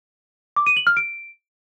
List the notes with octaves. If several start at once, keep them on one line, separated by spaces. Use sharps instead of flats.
D6
D#7
F#7
F6
D7